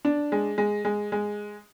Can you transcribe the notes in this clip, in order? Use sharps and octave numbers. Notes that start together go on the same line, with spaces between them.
D4
G#3
G#3
G#3
G#3